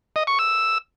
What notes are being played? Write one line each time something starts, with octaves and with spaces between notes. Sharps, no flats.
D#5
C#6
E6